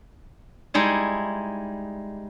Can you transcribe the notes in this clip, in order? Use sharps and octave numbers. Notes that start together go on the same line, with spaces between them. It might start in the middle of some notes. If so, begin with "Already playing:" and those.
G3 G#3 D#4 E4